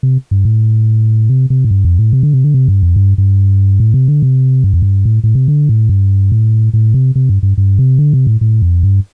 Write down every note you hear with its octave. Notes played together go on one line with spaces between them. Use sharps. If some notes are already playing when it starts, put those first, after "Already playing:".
C3
G2
A2
C3
C3
A2
G2
F2
A2
C3
D3
C3
D3
C3
G2
F2
G2
G2
A2
C3
D3
C3
G2
F2
G2
A2
A2
C3
D3
A2
G2
A2
A2
C3
C3
G2
G2
G2
C3
D3
C3
A2
A2
F2
G2